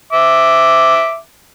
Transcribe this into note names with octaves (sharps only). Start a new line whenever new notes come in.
E5 D6